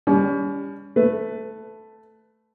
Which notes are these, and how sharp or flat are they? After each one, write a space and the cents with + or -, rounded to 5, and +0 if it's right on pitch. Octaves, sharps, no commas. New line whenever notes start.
G3 +25 C#4 +35
A3 +0 B4 +20